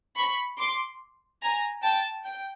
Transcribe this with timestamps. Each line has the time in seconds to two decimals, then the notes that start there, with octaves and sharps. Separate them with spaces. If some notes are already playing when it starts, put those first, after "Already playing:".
0.17 B5 C#6
0.58 C6 D6
1.42 G#5 A#5
1.83 G5 A5
2.25 G5